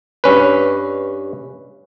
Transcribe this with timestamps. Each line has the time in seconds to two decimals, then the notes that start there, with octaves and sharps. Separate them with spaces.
0.24 G2 C#4 B4